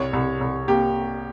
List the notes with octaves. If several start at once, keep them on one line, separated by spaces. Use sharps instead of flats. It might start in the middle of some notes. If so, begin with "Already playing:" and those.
Already playing: C2 C#5
C2
C2
A#3 G4